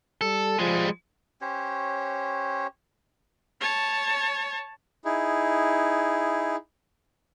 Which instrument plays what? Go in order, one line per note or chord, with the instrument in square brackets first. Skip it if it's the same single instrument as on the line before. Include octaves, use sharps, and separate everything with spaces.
[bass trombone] G3 [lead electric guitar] A4
[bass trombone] F3 [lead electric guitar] G3 G#3
[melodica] C#4 G4 C5 C#5
[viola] C#5 A5
[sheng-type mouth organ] D#4 E4 G#4